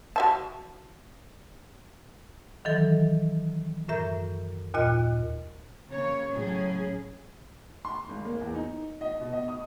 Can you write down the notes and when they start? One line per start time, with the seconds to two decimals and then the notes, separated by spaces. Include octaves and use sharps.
0.16 F#4 E5 A5
2.65 D#3 E3 F#3 A4
3.88 F#2 A2 A#4 E5 A#5 G6
4.74 D#2 A#2 F4 D#5 F6 F#6
5.88 C#3 A#3 C#5
6.33 A2 C#3 F#3 C#4 G#4
7.85 C6
8.09 G#1
8.25 A#3
8.41 E2
8.55 D#4
9.01 D#5
9.20 B2
9.33 D#5
9.48 D#6